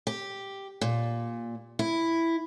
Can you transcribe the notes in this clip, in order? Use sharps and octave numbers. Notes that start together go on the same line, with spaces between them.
G4
A#2
E4